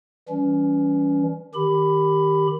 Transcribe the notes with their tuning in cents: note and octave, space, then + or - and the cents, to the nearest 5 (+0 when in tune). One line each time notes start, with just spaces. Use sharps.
E3 +0 G3 -5 C#4 +25
D#3 +0 G4 +0 B5 +10